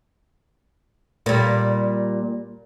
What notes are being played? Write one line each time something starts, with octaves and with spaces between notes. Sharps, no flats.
A#2 G3